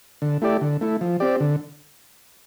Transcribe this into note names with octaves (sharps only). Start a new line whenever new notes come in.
D3
A3 E4 G4 D5
D3
A3 E4
F3
C4 G4 D5
D3